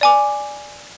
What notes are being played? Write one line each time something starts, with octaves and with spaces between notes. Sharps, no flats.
D5 G#5 D6